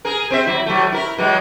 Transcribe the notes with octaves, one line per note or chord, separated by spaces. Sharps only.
G#4 A#4
C4 C5 E5
F#3 E4
F#3 A3
E4 A#4
E3 F#3 G#3